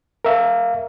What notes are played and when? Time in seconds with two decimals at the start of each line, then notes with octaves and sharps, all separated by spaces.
0.25 A#4 E5 F5